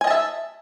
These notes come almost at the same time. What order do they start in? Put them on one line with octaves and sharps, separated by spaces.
G#5 D#5 A5 E5